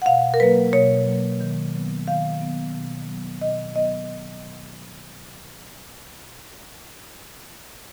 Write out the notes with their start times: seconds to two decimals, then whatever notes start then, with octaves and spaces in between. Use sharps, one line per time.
0.02 F#5
0.06 B2 F5
0.34 A#4
0.40 F#3 A#3 B4
0.73 B2 C#5
1.07 F#3 A#3
1.41 D#3
1.74 F#3 B3
2.07 D#3 F5
2.41 F#3 B3
2.74 B2
3.08 F#3 B3
3.41 B2 D#5
3.75 F#3 B3 D#5